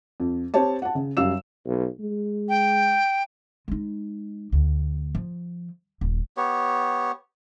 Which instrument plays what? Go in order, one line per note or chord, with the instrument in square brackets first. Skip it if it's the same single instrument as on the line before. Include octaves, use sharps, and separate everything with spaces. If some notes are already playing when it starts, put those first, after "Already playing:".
[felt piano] F2
C4 G4 C5 C#5 A5
F#5 A5
C#3
F#2 G3 F5 E6 E7
[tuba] B1
G#3
[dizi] G5
[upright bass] G#3 D#4
D2
F3
D#1
[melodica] B3 G4 C#5